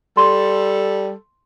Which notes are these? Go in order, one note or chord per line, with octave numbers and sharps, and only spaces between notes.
G3 A4 C6